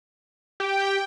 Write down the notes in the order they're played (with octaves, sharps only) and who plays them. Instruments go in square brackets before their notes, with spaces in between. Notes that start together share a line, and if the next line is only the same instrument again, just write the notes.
[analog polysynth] G4 [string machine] G5